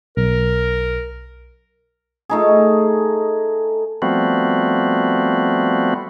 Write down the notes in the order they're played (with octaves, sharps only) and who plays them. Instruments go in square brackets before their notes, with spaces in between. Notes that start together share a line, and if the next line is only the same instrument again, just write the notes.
[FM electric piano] B1 [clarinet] A#4
[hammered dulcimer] A3 D#4 G#4
[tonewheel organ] F3 G3 A3 B3 C4 F#4